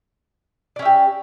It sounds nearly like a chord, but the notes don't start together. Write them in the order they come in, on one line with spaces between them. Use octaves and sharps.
D5 C#4 E5 G4